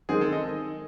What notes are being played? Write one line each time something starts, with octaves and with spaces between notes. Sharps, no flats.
D#3 G#3 C4 G#4
A4
D#5